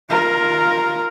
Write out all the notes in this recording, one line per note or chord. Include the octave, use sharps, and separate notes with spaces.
F4 A#4